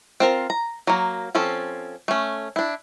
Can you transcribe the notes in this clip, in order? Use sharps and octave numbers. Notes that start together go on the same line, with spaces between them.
C4 F4 A#4
A#5
F#3 A#3
F3 C4 C#4 A4
A3 C#4
D4 E4